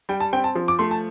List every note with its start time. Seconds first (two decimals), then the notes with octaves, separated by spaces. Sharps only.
0.09 G3 G5
0.20 A5
0.33 C4 G5
0.44 A5
0.55 F3
0.68 D6
0.79 A3 C6
0.91 A5